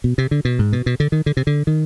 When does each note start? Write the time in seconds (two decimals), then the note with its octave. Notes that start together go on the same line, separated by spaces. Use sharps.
0.04 B2
0.18 C3
0.31 D3
0.45 B2
0.59 G#2
0.73 B2
0.86 B2
1.00 D3
1.12 D#3
1.26 D3
1.37 C3
1.47 D3
1.67 D#3